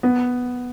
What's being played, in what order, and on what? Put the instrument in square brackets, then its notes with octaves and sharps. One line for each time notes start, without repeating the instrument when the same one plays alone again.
[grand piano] B3